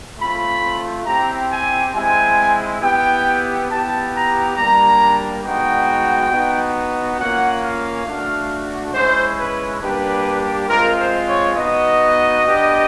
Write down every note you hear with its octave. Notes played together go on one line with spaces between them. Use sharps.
A3 C4 F4 B5
C4 E4 G4 A#5
G#5
G#3 C4 E4 G#5
B3 E4 G4 G5
B3 E4 G4 A5
A#5
G3 A#3 D4 A#5
G#3 B3 D#4 F#4 G5
B3 D#4 F#4
A#3 C#4 F4 F#5
F5
A3 D4 F#4
G#3 C#4 E4 C5
B4
G3 A#3 D4 G4 B4
G#3 C4 F4 A#4
C5
C#5
B3 D#4 F#4 D#5
B3 D4 G4